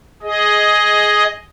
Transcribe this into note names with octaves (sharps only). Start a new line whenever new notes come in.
G#4 D#5